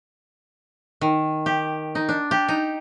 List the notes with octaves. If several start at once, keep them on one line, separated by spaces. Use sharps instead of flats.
D#3
G4
D#4
D4
G4
D#4